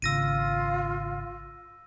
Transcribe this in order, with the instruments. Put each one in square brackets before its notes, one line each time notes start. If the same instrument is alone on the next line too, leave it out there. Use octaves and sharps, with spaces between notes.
[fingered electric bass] G#1 C#3 [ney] F4 [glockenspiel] E6 A#6 D#7